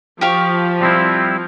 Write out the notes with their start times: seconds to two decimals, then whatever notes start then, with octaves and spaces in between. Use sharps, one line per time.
0.21 F3 G4 F5 C#6
0.81 G3 C4 E4